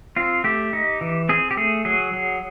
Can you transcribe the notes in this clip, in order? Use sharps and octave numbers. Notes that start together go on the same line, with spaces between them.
C4 F4
A3 G4
D#4
E3
C4 G#4
G4
A3 G#4
F#3 G#4
F#3